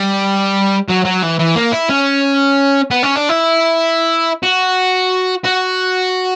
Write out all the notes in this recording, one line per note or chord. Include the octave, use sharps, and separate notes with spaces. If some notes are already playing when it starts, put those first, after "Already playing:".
Already playing: G3
F#3
F#3
E3
E3
A#3
E4
C#4
B3
C#4
D4
E4
F#4
F#4